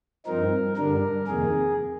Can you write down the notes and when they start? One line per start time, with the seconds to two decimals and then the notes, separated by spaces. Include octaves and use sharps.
0.26 G2 F3 C4 D#4 A#4
0.77 G2 D3 G3 D4 A#4
1.27 F2 C3 D#3 A#3 G#4